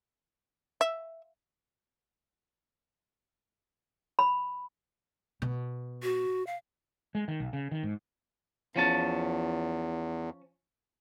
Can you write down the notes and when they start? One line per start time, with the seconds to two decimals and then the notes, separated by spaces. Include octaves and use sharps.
0.81 E5
4.19 B5
5.42 B2
6.03 F#4
6.47 F5
7.15 G#3
7.28 D#3
7.40 B1
7.53 C#3
7.71 D#3
7.83 G#2
8.76 E2 F3 C#4 A5